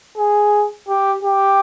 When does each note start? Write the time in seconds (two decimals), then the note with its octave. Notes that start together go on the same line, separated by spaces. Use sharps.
0.17 G#4
0.88 G4
1.23 G4